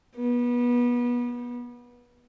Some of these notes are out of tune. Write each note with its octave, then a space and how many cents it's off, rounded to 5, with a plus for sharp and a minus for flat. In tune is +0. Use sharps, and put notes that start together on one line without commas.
B3 -25